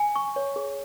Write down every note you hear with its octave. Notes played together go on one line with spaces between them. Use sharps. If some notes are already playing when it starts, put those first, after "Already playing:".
Already playing: G#5
C#6
C#5
G#4